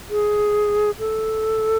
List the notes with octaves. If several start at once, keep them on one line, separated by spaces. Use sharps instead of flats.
G#4
A4